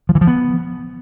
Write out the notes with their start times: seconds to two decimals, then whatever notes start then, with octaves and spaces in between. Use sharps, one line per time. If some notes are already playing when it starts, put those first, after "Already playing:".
0.09 F3
0.15 E3
0.21 F3
0.27 B3